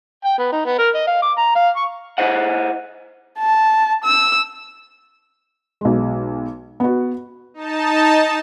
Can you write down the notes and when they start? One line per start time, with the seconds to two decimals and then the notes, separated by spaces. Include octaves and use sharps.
0.25 G5
0.38 B3
0.52 D#4
0.66 B3
0.78 A#4
0.94 D#5
1.07 F5
1.22 D6
1.37 A#5
1.55 F5
1.76 C#6
2.18 E4 C5 D#5 F#5
3.39 A5
4.05 E6
5.81 B1 G#3
6.80 B3 F#4
7.54 D#4 A5